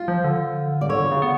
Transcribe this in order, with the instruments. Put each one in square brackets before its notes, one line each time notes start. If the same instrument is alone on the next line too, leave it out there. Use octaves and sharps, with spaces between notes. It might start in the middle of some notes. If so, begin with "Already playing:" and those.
Already playing: [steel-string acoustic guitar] F4
[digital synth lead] F3
D3
[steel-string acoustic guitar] D5
[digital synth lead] D3 [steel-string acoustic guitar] C#5
[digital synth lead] C#3
B3